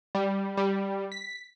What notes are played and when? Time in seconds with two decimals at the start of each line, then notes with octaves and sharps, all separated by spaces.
0.15 G3
0.57 G3
1.12 B6